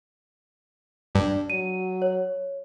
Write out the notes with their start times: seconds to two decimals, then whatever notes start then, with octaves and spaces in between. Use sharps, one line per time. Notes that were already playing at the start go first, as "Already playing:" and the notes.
1.15 G2 D4
1.50 F#3 D#7
2.02 C#5